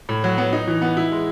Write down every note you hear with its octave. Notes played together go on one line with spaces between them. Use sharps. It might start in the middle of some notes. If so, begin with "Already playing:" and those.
A2
F#3
B3
D#4
E3
B3
E4
G#3